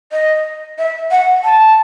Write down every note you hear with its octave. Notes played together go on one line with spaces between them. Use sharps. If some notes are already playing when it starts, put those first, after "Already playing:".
D#5
E5
F#5
A5